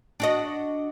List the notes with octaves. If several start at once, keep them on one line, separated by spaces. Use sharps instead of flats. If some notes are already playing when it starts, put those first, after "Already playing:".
D4 F#4 D#5